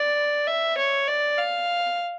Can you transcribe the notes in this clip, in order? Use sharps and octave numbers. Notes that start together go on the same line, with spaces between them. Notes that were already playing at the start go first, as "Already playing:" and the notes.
Already playing: D5
E5
C#5
D5
F5